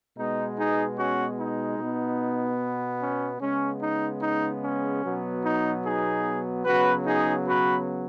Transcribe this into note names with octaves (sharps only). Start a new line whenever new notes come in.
B2 G#3 B3 D#4
D#4 G#4
C#4 F#4
D#4
B2 B3
C#4
C#3 G#3 B3 C#4
D#4
D#4
C#4
B2 F#3 B3
D#4
D#4 G#4
C#3 F#3 B3 F#4 B4
D#4 G#4
F#4 B4